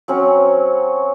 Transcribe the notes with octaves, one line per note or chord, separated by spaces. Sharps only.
F#3 C4 C#4